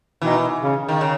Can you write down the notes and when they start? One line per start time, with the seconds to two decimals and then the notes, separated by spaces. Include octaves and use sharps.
0.22 B2 D#3 E3
0.61 C#3
0.88 D#3
1.01 C#3